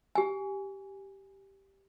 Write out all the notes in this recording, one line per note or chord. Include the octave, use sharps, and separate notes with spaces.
G4 G#5